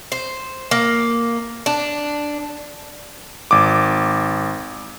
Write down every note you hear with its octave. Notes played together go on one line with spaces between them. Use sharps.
C5
A#3
D4
G#1 D6